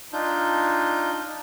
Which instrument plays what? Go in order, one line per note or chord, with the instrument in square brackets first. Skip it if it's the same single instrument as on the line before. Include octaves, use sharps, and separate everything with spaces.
[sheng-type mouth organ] D4 D#4 F4 G6